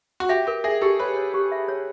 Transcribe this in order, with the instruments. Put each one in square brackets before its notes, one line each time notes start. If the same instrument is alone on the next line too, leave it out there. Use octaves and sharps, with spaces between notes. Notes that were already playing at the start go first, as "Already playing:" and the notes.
[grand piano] F#4
[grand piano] G4 [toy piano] E5
[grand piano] G4 [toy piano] A#4
[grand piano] G#4 [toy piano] E5
[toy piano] G4 [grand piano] A4
[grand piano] B4 [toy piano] C#5
[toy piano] C#5
G4
E5
C#5